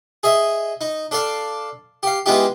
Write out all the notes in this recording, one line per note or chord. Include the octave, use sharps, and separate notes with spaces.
G#4 D#5 E5
D#4
D4 A4 D5 F5
G4 F5
E3 G#3 B3 D#4 F4 G4